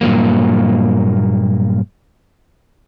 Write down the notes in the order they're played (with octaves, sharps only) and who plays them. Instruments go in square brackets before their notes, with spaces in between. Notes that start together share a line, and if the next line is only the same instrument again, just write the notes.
[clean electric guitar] G2 A#2 F#3 A#3